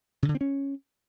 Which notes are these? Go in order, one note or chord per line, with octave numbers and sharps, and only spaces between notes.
C#3
D3
C4
C#4